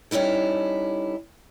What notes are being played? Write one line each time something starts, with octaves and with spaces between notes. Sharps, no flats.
G3 C#4 D#4 E4 A4